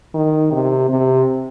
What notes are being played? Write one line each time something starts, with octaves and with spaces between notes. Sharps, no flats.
D#3
C3
C3